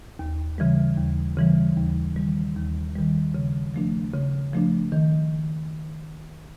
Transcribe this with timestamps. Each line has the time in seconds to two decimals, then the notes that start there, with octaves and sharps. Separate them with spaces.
0.19 D#2
0.58 C#3 E3 G3
0.98 D#2
1.37 C#3 E3 G3
1.77 D#2
2.16 D#3 G3
2.56 D#2
2.95 D#3 G3
3.35 C#3
3.74 F3 A3 D4
4.14 C#3
4.53 F3 A3 D4
4.92 D#3